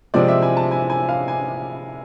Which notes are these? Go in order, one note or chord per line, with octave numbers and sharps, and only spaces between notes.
C3 F3 G#3 C4 D5
E5
G#5
A5
G#5
G#5
F5
G#5